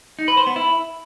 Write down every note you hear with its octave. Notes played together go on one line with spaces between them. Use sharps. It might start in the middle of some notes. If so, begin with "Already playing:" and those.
D#4
B4
C5
B3
E4